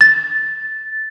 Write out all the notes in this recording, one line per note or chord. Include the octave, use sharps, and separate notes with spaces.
A6